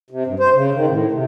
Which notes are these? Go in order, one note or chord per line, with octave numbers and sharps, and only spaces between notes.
C3
G2
C5
C#3
D#3
A2
C3